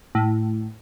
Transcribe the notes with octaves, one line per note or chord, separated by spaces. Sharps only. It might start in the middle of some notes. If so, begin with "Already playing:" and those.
A2